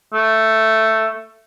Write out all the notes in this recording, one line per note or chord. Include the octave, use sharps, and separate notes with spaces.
A3